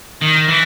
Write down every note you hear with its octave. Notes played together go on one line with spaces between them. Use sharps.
D#3
E3